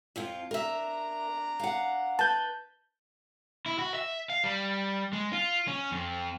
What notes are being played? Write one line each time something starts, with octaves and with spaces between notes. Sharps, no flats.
F2 F3 F4
D4 A#4 E5 A#5
F5 F#5
B4 A5 G6
E4
F#4
E5
F5
G3
G#3
F4
C#4
F2